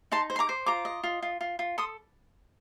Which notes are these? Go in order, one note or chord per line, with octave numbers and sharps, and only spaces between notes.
D#4 A5 C6
C5
C6
A#5 D6
C5
F4 A#5 D6
D#5
F4
F4
F4
F4
A4 C6 D#6